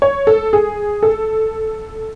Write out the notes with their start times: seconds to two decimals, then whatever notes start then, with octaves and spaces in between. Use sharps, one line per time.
0.02 C#5
0.27 A4
0.53 G#4
1.03 A4